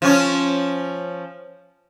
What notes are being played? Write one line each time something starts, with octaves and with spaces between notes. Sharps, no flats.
F3 C#4